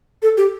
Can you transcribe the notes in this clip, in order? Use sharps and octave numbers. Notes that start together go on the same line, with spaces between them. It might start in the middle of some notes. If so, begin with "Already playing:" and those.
A4
G4